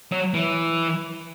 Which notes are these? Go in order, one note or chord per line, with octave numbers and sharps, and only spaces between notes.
F#3
E3